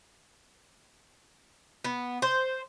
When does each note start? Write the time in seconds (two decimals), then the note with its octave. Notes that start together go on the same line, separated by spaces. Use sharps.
1.84 B3
2.22 C5